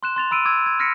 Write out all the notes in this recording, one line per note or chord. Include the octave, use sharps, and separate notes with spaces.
C6 F#6 E7
C6 A6 F7
B5 E6 D7 D#7
D6 E6 G#6
G#6
F6 G#6 A#6 B6 C#7 D7